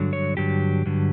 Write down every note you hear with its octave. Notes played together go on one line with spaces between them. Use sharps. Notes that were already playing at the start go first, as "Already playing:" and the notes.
Already playing: G2 D3 F#3
C#5
G2 D3 F#3 G4
G2 D3 F#3